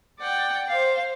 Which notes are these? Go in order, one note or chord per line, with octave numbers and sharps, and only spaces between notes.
D5 F#5 G5
C5 F5